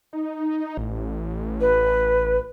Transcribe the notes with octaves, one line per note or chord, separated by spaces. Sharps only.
D#4
A1
B4